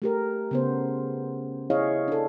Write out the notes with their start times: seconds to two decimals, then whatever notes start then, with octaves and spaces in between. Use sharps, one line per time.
0.02 A3 G4 A#4
0.51 C#3 B3 C5
1.70 E4 G#4 C#5 D#5 F5
2.08 D4 A4